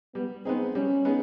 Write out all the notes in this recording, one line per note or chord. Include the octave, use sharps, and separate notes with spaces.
G3 B3
B3 C4 D#4 G#4
G3 C#4
B3 D#4 G#4